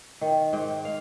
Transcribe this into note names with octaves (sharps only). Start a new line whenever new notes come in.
D#3
G#2 G5
F5